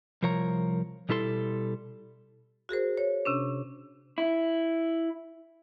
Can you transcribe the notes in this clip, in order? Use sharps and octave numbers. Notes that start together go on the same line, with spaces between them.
C2 F3 A#4 C#5 A#5
B2 G3 E4 A4 C6
F#4 G#4 A#4 C5
C#5
C3 C#4 D4
E4